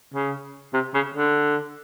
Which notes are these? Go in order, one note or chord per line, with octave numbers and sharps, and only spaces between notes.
C#3
C3
C#3
D3